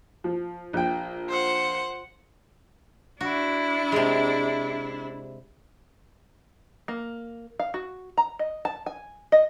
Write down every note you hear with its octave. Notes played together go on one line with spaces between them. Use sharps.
F3
A#1 G5
C5 F#5
D4 E4 F#4
C3 G#3
A#3
F5
F#4
A#5
D#5
A5
G#5
D#5